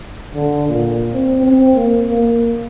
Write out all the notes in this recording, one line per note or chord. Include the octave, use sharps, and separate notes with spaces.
D3
A#2
C4
C4
A#3
A#3